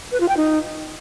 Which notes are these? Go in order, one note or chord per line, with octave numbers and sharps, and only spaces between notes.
B4
F4
G5
D#4